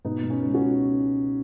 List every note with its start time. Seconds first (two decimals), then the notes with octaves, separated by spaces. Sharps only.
0.05 B2 B3 D#4
0.23 B2
0.30 C#4
0.42 C#2
0.54 C#4 F#4